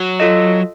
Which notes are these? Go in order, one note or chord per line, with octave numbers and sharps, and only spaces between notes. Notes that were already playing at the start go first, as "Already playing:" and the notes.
Already playing: F#3
F4 A4 D#5